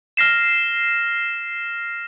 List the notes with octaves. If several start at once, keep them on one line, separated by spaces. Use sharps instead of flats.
F6 A#6 C7 E7